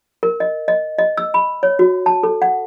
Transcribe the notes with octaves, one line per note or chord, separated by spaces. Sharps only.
A#4
D#5
D#5
D#5
E6
B5
C#5
F#4
A5
A4
F#5